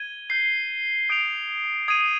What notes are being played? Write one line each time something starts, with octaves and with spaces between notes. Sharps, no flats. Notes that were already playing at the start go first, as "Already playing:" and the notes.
Already playing: G#6 D#7 G7
G6 C7 G7
D#6 G6 D7 F7
D#6 G#6 C7 D#7